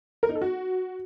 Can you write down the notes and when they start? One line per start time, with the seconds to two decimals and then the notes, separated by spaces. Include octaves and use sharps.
0.23 A#4
0.29 D#4
0.35 A4
0.42 F#4